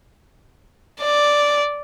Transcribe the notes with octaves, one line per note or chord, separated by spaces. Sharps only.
D5